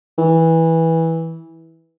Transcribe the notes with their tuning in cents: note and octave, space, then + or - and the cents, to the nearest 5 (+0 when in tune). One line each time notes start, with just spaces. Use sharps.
E3 -15